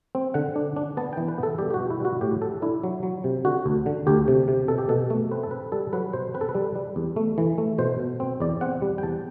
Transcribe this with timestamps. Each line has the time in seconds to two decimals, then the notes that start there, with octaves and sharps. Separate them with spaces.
0.15 C4
0.34 D3 F#5
0.56 D4
0.76 D4
0.97 B3 A5
1.13 E3 G5
1.28 B4
1.38 B3
1.43 A4
1.58 G3 G4
1.70 G4
1.74 F#4
1.80 B2
1.90 E4
2.00 G3 F#4
2.21 A2 G4
2.41 A2 A4
2.62 D4 E4
2.83 F#3
3.03 F#3
3.24 C3
3.45 D3 F#4
3.66 D2
3.86 D3
4.07 D2 G4
4.28 C3
4.48 C3
4.68 B2 A4
4.78 G4
4.89 B2 A4
5.10 A3
5.32 C4 B4
5.43 A4
5.51 C4 B4
5.72 G3 A4
5.93 F#3 B4
6.13 B2 C5
6.34 C4 B4
6.41 A4
6.49 B4
6.55 G3
6.76 G3
6.96 E2
7.16 A3
7.38 E3
7.58 A3
7.78 B2 C5
8.00 B2
8.20 C4
8.40 E2 D5
8.61 C4 F#5
8.82 G3
8.98 G5
9.03 E2 A5